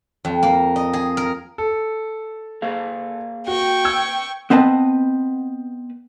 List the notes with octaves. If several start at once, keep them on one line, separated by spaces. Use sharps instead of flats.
F2
A#3
D#5
G#4
A#4
A4
A#3 G#4 F5
F#4 G5 C#6
E6 G#6
B3 C4 B4 D#5 A5